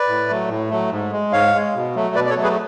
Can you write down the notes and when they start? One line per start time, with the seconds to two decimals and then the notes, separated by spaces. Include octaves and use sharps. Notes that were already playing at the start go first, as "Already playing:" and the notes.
Already playing: B4 D5
0.08 A2
0.28 F#3 A3
0.48 A2
0.69 F#3 A3
0.90 G#2
1.12 G#3
1.32 G#2 C#5 F5
1.53 G#3
1.75 B2
1.95 F#3 A3
2.15 B2 B4 D5
2.25 D5
2.30 A4 C#5
2.36 F#3 A3
2.43 G#4 B4